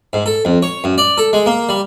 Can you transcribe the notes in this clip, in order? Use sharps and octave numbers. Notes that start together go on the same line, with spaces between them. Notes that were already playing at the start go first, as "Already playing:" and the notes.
G#2
A4
F2
C#5
F#2
D5
A4
G#3
A#3
G3